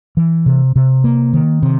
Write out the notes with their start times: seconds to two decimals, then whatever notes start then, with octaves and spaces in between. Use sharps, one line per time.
0.17 E3
0.46 C3
0.76 C3
1.04 A#3
1.33 D#3
1.63 C3